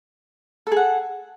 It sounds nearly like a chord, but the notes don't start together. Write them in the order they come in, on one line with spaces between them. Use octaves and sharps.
A4 G#4 F#5